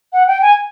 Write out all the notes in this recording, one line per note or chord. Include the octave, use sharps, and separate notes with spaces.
F#5
G5
G#5